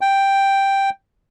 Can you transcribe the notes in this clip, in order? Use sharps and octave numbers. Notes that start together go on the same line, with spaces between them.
G5